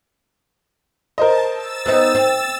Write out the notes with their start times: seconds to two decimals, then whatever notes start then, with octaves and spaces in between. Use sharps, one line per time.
1.18 A#4 C5 D#5 A5
1.54 E6 A6 E7
1.86 B3 C4 D#4
2.15 C4